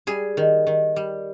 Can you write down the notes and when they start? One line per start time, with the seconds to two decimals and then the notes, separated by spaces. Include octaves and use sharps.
0.07 G3 G#4
0.37 D#3
0.67 D#3
0.96 G3